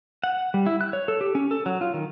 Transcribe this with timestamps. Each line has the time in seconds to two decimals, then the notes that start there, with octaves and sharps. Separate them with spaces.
0.24 F#5
0.54 G3
0.67 E4
0.81 F#6
0.93 C#5
1.08 A4
1.21 G4
1.35 C#4
1.51 A4
1.66 F#3
1.81 F4
1.94 D#3